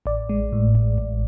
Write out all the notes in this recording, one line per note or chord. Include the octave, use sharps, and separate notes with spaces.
A1 D5
G#3
A2
A1
A1